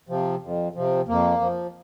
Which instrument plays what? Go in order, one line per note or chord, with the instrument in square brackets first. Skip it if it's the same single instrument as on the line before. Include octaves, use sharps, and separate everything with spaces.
[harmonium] C3 F3
F2
C3 F3
F2 A#3
F3